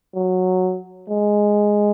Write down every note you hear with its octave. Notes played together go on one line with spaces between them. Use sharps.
F#3
G#3